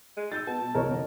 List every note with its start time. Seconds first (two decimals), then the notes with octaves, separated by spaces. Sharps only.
0.17 G#3
0.32 D#4 E6 G6 A6
0.47 B3 A5
0.60 B2
0.75 F#1 C2 E3 A#4 C#5 D#5
0.88 F2 D3